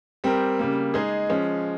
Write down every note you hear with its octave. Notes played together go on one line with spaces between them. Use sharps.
G3 C4 G4 A#4
C#3 G3 A#3
G#3 D#4 G#4
F3 G#3 C#4